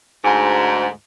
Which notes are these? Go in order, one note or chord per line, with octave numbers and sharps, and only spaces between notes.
D2 G#2